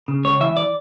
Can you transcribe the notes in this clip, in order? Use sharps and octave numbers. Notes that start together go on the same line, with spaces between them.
C#3
C#2 C#5
E3 E5
D5